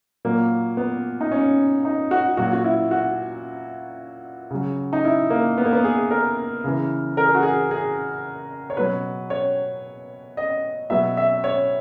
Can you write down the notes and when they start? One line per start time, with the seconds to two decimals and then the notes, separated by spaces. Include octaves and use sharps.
0.25 A#2 F#3 A#3
0.77 B3
1.21 D#4
1.32 C#4
1.85 D#4
2.11 F#4
2.37 A#2 F#3 F#4
2.53 F#4
2.64 E4
2.91 F#4
4.51 C#3 F#3
4.93 D#4
5.05 E4
5.30 A#3
5.58 B3
5.65 A#3
5.73 B3
5.84 G#4
6.11 A#4
6.64 C#3 E3
7.17 A#4
7.25 G#4
7.35 F#4
7.43 G#4
7.71 G#4
8.70 C#5
8.77 B2 F#3 B4
9.30 C#5
10.37 D#5
10.90 B2 F#3 E5
11.17 E5
11.44 C#5